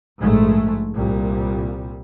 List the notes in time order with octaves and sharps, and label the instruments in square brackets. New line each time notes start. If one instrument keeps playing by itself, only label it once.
[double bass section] A#1 G#2 G#3 A3
C2 A#2 G3